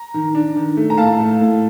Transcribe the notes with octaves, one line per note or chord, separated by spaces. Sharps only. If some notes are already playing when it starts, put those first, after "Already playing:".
Already playing: A#5
D#3
D4
D#3
A3
A#5
A2 F5 A5
A3
A2